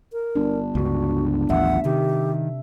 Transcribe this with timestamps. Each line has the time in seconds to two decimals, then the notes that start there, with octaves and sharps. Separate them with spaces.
0.13 A#4
0.35 G1 D4
0.75 C#2 G2 F#4
1.50 A1 D#2 F3 E5 F#5
1.85 C3 D#3 G4